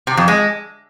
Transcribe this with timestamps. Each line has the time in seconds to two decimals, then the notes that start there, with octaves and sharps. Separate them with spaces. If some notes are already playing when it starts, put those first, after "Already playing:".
0.07 C3
0.17 F2
0.28 G#3